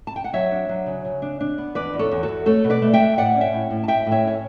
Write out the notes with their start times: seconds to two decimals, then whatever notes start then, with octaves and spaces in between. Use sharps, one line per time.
0.07 A5
0.16 G5
0.24 F#5
0.33 F#3 C#5 E5
0.51 D4
0.69 F#3
0.86 C#3
1.05 C#3
1.22 D4
1.41 D4
1.58 B3
1.75 E2 B4 D5
1.93 E2
1.99 A4 C#5
2.11 E2
2.23 F#4 A4
2.28 E2
2.46 A3 A4 C#5
2.64 B2
2.70 B4 D5
2.82 A3
2.93 E5 G5
3.00 A3
3.17 A2 D5 F#5
3.35 C#4
3.41 E5 G5
3.53 A2
3.70 A2
3.84 A5
3.88 A2 E5 G5
4.06 A2
4.11 C#5 E5
4.23 C#4 C#5